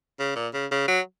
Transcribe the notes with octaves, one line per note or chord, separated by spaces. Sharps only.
C#3
A#2
C#3
C#3
F#3